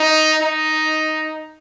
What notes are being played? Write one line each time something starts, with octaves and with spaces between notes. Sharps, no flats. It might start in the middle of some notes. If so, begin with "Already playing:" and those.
Already playing: D#4
D#4